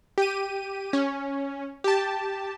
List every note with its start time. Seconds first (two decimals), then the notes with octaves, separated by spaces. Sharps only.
0.18 G4 D#7
0.93 C#4
1.84 G4 A5